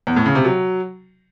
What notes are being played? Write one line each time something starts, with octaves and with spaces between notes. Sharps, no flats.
E2
A2
C#3
C3
F#3